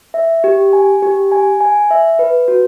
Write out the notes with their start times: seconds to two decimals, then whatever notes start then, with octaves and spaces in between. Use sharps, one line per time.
0.14 E5
0.44 G4
0.73 G#5
1.02 G4
1.32 G#5
1.61 G#5
1.91 E5
2.19 B4
2.48 F#4